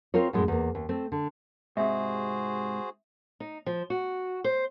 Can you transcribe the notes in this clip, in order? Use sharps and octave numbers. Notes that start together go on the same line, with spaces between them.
C4 F4 A#4 C#5
F#2 A2 G#3
E2 A#3
D#2
A3 C4
D3
G#2 C3 F#4 G#4 C5 E5
D#4
F3
F#4
C5